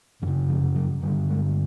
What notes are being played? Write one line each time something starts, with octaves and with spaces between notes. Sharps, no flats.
F#2 E3
C#3
F3
F#3
G2 D3 G3
G#3